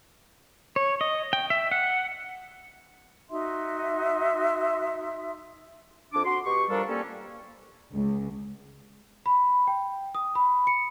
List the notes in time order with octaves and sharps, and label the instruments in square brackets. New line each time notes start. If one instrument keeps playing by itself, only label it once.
[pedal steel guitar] C#5
D#5
G5
E5
F#5
[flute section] D#4 F#4 E5 C6
[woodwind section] F2 D4 D6
F#4 C6
B2 G4 C#6
F3 G3 D4 A4 A#4
G3 A#3 C#4 A4
[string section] C#2
[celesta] B5
G5
D#6
B5
C#7